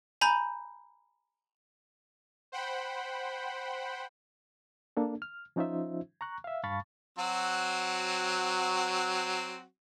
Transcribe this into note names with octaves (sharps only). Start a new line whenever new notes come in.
G#5 A#5 B5 G6
C5 F#5 G5 B5
A#3 D4 A4
F6
F3 C#4 D#4 F4 C5 E5
A#5 C#6 F#6
E5 F5
G2 F5 A5 B5 C#6 A6
F#3 C4 F#4